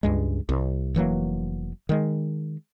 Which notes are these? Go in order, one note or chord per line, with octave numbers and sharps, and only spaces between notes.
C#2 G2 G#3
C2
F1 E3 F#3 A#3
D#3 G#3